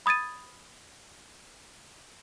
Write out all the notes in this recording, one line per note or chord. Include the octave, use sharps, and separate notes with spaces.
B5 D#6 G#6 A6 D#7